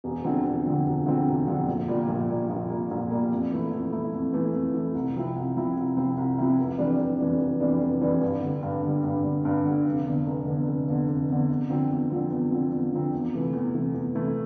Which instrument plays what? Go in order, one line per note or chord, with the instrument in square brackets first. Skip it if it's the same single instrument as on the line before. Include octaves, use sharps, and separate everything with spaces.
[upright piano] E1
D2 D3 F3 C4
E1
D2 D3 F3 C4
E1
D2 D3 F3 C4
E1
D2 D3 F3 C4
A#1
A#2 G3 A#3
A#1
A#2 G3 A#3
A#1
A#2 G3 A#3
A#1
A#2 G3 A#3
F2
E3 A3 E4
F2
E3 A3 E4
F2
E3 A3 E4
F2
E3 A3 E4
C2
C3 F3 C4 E4
C2
C3 F3 C4 E4
C2
C3 F3 C4 E4
C2
C3 F3 C4 E4
F1
F2 E3 G3 D4
F1
F2 E3 G3 D4
F1
F2 E3 G3 D4
F1
F2 E3 G3 D4
G2
D3 G3
G2
D3 G3
G2
D3 G3
G2
D3 G3
F1
E2 D3
F1
E2 D3
F1
E2 D3
F1
E2 D3
E2
D3 F3 C4
E2
D3 F3 C4
E2
D3 F3 C4
E2
D3 F3 C4
E2
C3 E3 A3
E2
C3 E3 A3
E2
C3 E3 A3